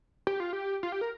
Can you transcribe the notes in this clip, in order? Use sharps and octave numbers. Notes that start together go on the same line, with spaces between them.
G4
F4
G4
F4
G4
A#4